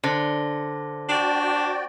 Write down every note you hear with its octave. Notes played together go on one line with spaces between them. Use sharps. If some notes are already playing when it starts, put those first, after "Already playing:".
D3 C5 A5 A#6
D4 F#4 D5 G5